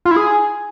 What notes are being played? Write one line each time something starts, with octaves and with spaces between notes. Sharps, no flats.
F4
E4
G#4